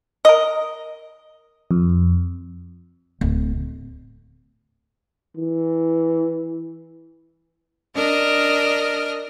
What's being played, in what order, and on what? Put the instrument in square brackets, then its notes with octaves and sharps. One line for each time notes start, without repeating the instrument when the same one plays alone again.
[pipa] A#4 D#5
[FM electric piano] F2
[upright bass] D1
[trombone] E3
[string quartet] D4 A#4 D#5 F6